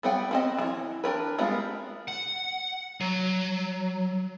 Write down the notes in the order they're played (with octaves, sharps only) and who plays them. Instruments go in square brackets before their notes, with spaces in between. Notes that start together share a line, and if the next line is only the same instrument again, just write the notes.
[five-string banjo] G3 B3 F#5 G5
B3 C4 D#5
D#3 E3
D4 A#4 B4
G3 G#3 B3 F4
[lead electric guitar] F#5
F#3